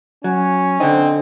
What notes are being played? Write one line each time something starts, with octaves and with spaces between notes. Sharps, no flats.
F#3 C#4
D3 C4 D#4